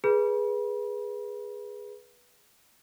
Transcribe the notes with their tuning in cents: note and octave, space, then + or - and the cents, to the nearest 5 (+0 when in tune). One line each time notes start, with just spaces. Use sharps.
G#4 +0 B4 -15 B5 -35